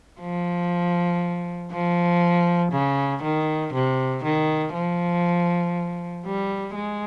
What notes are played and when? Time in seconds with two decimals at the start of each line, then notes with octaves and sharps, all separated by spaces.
0.20 F3
1.72 F3
2.72 C#3
3.23 D#3
3.73 C3
4.24 D#3
4.74 F3
6.25 G3
6.75 G#3